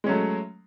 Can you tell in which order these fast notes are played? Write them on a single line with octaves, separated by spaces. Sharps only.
G#3 C#4 F#3 A3